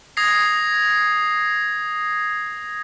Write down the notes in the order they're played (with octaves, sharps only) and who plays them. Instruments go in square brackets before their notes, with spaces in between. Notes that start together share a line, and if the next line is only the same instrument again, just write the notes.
[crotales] D#6 G#6 A#6 C7